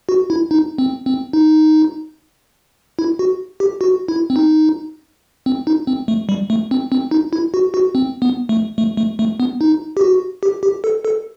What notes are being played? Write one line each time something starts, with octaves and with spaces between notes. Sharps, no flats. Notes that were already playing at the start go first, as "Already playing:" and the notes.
F#4
E4
D#4
C4
C4
D#4
E4
F#4
G4
F#4
E4
C4
D#4
C4
D#4
C4
A3
G3
A3
C4
C4
D#4
E4
F#4
F#4
C4
B3
A3
A3
A3
A3
B3
D#4
G4
F#4
G4
G4
A4
A4